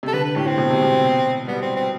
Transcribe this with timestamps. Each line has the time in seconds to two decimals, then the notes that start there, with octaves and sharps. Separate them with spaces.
0.03 C3 A4
0.13 D3 B4
0.25 B4
0.36 A2 G4
0.47 C4
0.58 B2
0.71 C3
0.82 B2
1.48 G3 B3
1.62 C4
1.76 C4